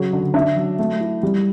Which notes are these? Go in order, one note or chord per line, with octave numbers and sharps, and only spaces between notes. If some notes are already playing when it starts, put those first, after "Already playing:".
Already playing: C#3 F#3
D3
D4 E5
F#3
A3
E4
G3